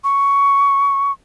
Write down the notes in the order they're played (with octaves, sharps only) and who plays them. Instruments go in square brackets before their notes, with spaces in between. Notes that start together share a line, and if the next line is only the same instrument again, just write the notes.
[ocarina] C#6